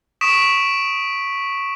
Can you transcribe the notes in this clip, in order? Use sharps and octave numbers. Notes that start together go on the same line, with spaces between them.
C#6 D#6 B6 D7 E7